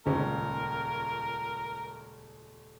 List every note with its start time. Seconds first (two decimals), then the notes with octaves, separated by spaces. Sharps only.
0.06 D#1 C#2 C#4 A#4